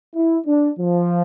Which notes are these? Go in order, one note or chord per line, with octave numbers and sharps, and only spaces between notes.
E4
D4
F3